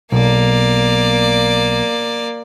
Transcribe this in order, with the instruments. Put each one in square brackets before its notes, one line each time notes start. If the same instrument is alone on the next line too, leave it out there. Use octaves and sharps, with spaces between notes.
[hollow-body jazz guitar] B1 [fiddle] A#3 D5